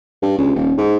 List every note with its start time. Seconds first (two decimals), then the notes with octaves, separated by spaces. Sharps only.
0.22 G2
0.38 C#2
0.55 D#1
0.77 G#2